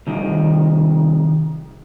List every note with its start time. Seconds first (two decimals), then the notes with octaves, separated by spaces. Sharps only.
0.07 C2 D#3